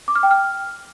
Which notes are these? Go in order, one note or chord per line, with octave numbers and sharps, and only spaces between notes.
D6
F6
G5
F6